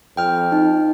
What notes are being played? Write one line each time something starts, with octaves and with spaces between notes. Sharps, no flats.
F2 G5 F6
D#4